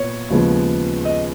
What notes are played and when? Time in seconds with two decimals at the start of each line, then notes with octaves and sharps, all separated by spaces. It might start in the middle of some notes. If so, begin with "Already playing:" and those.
Already playing: A#2 B3 C#5
0.30 D#2 C#3 F3 G#3 B3
1.05 D#5